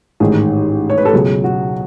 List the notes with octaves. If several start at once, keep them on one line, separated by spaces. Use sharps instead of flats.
A1 G#2 D#3 G#4
C#5
B4
A4
C#2 B2 F#3 G#4
F#4